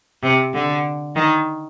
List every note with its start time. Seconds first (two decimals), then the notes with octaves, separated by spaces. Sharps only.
0.23 C3
0.54 D3
1.15 D#3